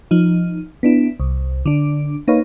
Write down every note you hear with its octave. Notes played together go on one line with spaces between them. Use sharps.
F3 D#4
B3 D4 E4
C2
D3 D4
A#3 D#4 B4 C#5 F5